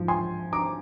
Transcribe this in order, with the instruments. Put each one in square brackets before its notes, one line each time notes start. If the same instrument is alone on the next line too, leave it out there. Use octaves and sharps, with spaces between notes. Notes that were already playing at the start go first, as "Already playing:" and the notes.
Already playing: [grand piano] G#2 F3
G#5 C6
A#5 D6